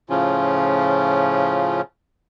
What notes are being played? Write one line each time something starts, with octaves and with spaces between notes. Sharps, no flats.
A2 C#3 F3 C#4 F4